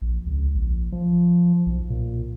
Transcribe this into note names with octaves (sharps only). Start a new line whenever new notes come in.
A#1
C#2
A#1
F3
B1
A#2